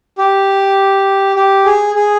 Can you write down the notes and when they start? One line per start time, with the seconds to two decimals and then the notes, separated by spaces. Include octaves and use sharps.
0.18 G4
1.36 G4
1.65 G#4
1.95 G#4